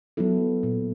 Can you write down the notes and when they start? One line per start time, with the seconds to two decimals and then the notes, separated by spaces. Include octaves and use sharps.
0.17 F#3 B3 E4 A4
0.63 A#2